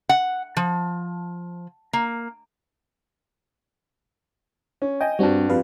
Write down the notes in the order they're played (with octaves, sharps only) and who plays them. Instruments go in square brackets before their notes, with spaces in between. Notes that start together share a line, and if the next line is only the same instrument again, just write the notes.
[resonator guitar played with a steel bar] F#5
F3
A#3
[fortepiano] C#4
[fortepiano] D#5 [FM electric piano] G5 G#5
[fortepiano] G2 F#4 [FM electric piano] G3 C4 D4
[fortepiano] F2 [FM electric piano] G4 B4 F5